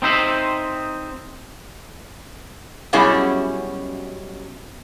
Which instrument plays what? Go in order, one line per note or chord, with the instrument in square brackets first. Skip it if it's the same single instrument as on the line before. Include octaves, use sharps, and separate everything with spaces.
[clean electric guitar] C4 D#4 C5 E5
[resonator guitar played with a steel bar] F#2 B2 G3 C#4 E4 G#4